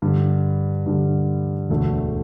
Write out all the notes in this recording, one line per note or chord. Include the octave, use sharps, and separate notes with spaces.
G2 D3 G3
G2 D3 G3
E1 D2 D3 A3